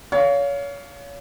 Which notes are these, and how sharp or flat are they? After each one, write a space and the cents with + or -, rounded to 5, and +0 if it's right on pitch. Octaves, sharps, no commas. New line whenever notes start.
C#5 +30 F5 +0